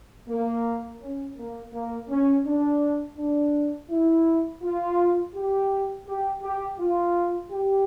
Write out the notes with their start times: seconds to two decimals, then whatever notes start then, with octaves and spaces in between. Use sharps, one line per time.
0.29 A#3
1.02 C#4
1.38 A#3
1.74 A#3
2.10 C#4
2.47 D4
3.18 D4
3.90 E4
4.63 F4
5.35 G4
6.07 G4
6.43 G4
6.79 F4
7.51 G4